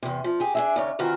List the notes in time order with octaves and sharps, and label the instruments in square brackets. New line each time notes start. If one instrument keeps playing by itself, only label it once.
[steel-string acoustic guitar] E2 C3
F3
G4 G#4
D4 G#4 E5
D#2 C#3 C#5
C3 D#3 E3 F4 F#4